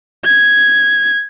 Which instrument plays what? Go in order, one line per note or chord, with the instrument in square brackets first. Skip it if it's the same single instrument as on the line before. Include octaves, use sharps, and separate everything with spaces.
[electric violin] G#6